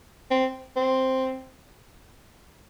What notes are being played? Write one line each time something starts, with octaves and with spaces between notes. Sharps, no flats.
C4
C4